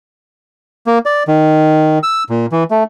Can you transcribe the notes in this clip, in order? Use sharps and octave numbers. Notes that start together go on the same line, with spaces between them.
A#3
D5
D#3
E6
A#2
E3
A3